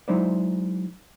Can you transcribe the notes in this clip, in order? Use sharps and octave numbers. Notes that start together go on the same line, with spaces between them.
F#3 G#3 D#4 E4 C5 D5